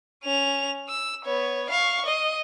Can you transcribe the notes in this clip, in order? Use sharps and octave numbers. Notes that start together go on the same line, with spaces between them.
C#4 F7
E6
B3 C#5
F5 C#6
D#5